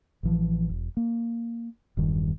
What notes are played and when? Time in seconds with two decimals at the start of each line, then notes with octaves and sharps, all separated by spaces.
0.23 A1 E3 F3
0.69 E1
0.97 A#3
1.97 E1 G2 D#3